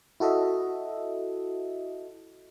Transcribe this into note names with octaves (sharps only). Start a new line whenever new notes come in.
E4 F#4 A4 D#5 E5